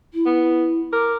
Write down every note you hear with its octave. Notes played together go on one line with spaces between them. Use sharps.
E4
B3
A#4 D6